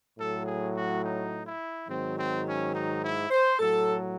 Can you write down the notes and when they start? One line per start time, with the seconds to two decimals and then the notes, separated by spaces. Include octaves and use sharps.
0.18 A2 F#3 A4
0.46 G#4
0.74 F#4
1.04 D#4
1.46 E4
1.88 G#2 D#3 F#3 C4
2.17 C4
2.46 C#4
2.75 D#4
3.03 E4
3.31 C5
3.59 A2 F#3 A4